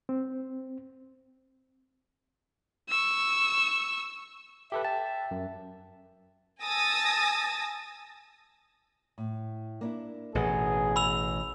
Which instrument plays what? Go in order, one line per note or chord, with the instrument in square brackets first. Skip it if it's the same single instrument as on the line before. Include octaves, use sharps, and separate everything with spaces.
[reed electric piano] C4
[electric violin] C#6 E6
[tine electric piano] G4 A4 B4 [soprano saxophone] E5
[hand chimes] G5 [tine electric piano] A5
[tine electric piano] F#2
[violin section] G#5 A5 D#6 E6 A6 A#6
[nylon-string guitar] A2
A#3 D4 E4
[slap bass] A1 B2 [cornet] G#4 [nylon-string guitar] A#4 B4 F#5
[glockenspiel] B5 E6 F7